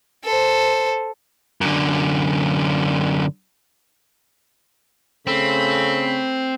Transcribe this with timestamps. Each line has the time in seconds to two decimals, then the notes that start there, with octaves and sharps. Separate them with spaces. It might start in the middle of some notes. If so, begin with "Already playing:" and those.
0.24 A4 C5
1.61 F#2 D3
5.27 C#3 A3 C4 A4 B5